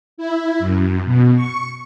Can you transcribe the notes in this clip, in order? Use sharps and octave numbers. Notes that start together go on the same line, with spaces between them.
E4
F#2
B2
C#6